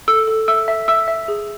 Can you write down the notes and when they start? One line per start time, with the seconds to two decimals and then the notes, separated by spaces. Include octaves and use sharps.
0.08 A4 E6
0.27 A4
0.48 E5 E6
0.68 E5
0.88 E5 E6
1.08 E5
1.28 G#4